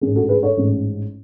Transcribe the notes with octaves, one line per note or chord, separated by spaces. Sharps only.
A1 G#2 G#3 C#4 G#4
F#4 A4
G#4 B4
A4 C#5
A1 G#2 G#3 C#4